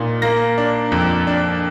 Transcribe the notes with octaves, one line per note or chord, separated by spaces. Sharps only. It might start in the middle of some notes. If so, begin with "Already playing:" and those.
Already playing: A#2 D#4
A#3 A#6
D4
F2
D4